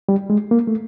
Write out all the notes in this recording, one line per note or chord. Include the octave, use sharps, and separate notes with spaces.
G3
G#3
A#3
A3